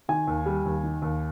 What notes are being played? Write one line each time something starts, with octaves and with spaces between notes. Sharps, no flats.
D#3 G#5
D#2
G3
D#2
D#3
D#2